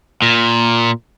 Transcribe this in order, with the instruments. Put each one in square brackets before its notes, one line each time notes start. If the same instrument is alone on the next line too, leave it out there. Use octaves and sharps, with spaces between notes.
[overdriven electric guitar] A#2